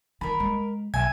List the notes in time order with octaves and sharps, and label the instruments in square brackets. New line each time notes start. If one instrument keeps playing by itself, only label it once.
[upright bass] D#3 [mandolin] A#4 B5
[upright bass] G#3
[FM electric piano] B1 [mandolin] E5 G#5 [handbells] G#6